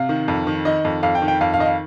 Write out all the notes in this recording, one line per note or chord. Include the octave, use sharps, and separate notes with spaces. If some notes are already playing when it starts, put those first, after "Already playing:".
Already playing: C3 F5
D#3
F2
D#3
D#3 D#5
F2
F2 F5
G5
D#3
G5
F2 F5
F5
D#3 D#5
F5